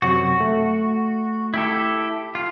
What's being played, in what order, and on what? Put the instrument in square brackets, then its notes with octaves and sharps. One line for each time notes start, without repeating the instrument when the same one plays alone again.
[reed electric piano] F#2 C3 F#3 [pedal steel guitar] F#4
[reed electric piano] A3
[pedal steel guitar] E4 G4 A4
F4